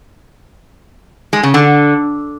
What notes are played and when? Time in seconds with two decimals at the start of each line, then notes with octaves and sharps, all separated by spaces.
1.33 G#3
1.43 C#3
1.54 D3